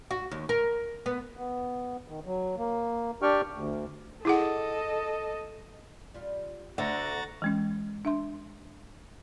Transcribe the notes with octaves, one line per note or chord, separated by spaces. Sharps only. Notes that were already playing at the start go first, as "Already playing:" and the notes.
F#4
D#2
A#4
B3
B3
D#3
F#3
A#3
D4 G4 D5 G5 C#6 F6
D2
E4 G#4 A4 D#5 F#5
G3 F4
D2 D3 F#4 E5 F#5 A#5 A6
E3 G#3 C#4
D4 E5 C6